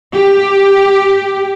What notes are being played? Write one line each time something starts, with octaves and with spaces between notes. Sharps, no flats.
G4